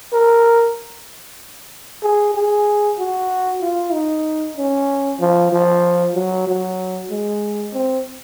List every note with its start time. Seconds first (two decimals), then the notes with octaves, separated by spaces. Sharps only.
0.13 A#4
2.03 G#4
2.35 G#4
2.99 F#4
3.62 F4
3.93 D#4
4.57 C#4
5.20 F3
5.52 F3
6.15 F#3
6.47 F#3
7.11 G#3
7.74 C4